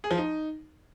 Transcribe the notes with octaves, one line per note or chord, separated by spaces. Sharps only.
G#4
F3
D#4